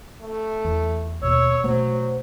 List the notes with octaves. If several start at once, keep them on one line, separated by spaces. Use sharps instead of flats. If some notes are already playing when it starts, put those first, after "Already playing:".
A3
E2
D#2 B2 C#5 E6
B2 F#3 A3 C5